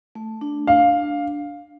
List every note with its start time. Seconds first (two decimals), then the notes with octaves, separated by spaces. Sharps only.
0.15 A3
0.41 D4
0.67 D4 F5